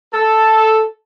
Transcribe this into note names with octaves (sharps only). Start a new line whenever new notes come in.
A4